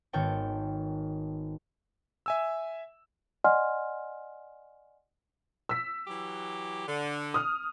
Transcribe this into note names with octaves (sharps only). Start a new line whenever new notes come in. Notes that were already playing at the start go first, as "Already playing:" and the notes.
G#1 D#3 B3 C#5 G5 A5
E5 G#5 E6
D5 D#5 F#5 G#5 C6 F6
E6 B6
E3 F#3 G4
D3
D#6 F6